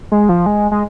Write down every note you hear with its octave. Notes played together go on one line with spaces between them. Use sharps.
G#3
F3
G#3
G#3